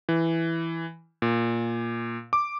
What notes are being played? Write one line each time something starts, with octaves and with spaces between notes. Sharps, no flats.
E3
A#2
D6